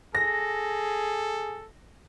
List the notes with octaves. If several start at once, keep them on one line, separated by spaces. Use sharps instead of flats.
G#4 A4 A#6